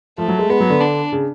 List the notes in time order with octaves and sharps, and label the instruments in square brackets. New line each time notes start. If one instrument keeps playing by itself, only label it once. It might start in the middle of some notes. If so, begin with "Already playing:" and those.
[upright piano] F3 [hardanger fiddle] A3
[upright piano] F#3
G#3
[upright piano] G#3 [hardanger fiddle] B3
[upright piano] F#3
D3
[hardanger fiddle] D4
[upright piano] C#3